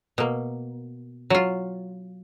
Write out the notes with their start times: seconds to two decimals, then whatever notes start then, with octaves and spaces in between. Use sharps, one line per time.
0.18 B2 A#3
1.30 F#3 F4